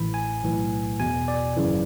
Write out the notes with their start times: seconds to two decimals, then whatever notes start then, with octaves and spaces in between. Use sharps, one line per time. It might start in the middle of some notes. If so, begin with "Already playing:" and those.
Already playing: A1 A2 E3 B5
0.14 G#5
0.43 B1 A2 E3
1.00 E2 B2 G#5
1.28 D5
1.56 G#1 F#2 C#3 E3